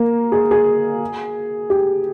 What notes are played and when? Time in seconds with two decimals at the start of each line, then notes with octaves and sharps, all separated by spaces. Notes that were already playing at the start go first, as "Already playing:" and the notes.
Already playing: A#3
0.32 G#4
0.51 G#4
1.70 G4